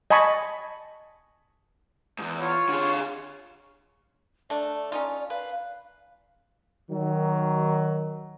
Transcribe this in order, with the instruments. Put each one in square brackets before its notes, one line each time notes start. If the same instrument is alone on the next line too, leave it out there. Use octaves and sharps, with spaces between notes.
[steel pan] D#5 G#5 A5 B5 C#6
[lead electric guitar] E2 G#2
[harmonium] F4 C#5
[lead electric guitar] D3 G#4
[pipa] A3 D4 [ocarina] D5
[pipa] C#4 D#4 F4
[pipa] B4 [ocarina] F5
[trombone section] D#3 F#3